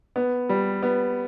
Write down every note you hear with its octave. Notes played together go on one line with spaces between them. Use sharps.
B3
G3
B3